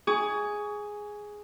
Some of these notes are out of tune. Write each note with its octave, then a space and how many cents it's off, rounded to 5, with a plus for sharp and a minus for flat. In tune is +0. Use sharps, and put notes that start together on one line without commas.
G#4 +0 C#6 +30